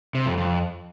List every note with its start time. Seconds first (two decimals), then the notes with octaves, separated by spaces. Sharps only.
0.15 C3
0.26 F2
0.38 F2